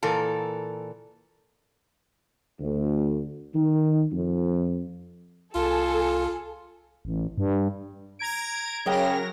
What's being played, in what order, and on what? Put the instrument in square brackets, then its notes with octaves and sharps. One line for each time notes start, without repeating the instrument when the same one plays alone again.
[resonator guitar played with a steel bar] A#2 E3 A4 A#4
[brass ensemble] D2
D#3
F2
[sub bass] C2 [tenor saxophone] F4 [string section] G#4 A4
[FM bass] A1
G2
[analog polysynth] A#5 G#6 D7
[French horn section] C#3 [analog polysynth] F#3 A#4 A#6 [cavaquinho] G4 D#5